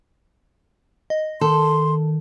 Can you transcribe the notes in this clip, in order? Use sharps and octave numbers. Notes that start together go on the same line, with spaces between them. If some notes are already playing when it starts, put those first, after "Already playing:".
D#5
D#3 A4 C6